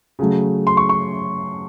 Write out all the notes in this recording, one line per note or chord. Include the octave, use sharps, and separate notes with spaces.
C#3 F#3 A3
C6
C#6
C#6